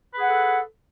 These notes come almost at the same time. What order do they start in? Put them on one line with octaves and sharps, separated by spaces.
B4 G#4 F#5 A4